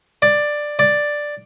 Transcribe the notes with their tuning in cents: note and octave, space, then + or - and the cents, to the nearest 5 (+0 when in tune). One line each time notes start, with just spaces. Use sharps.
D5 +10
D5 +5